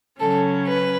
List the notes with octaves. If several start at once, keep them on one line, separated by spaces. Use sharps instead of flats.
C#3 F#3 C#4 A4
B4